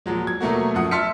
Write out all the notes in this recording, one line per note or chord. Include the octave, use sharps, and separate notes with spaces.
A#2 F3 F#3 G#3
G#6
B2 F#3 A3 A#3 F#4
F#2 F3 A3 F#5 D#6
E5 A5 C6 F6 B6 C#7